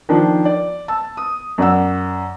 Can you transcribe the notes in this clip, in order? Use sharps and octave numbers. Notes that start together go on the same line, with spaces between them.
D#3 F3 D4
D5
A5 E6
D#6
F#2 D5 F#5 E6